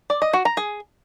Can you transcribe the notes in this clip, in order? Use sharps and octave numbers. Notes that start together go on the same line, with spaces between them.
D5
D#5
F#4
A#5
G#4